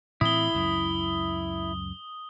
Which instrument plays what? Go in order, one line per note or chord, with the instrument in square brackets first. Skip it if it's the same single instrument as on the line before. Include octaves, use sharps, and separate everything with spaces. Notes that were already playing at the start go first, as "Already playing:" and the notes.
[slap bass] A2 E3 C4 [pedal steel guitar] E4 [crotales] D#6 G7
[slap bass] C#2 F#2